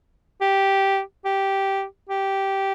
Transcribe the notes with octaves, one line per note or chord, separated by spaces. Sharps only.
G4
G4
G4